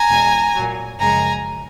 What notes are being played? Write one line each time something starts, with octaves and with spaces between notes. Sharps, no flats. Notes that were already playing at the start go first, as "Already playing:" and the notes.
Already playing: G#5 A#5
E2 B2 G#3
A#2 F#3
F#2 C#3 F3 G#3 G#5 A#5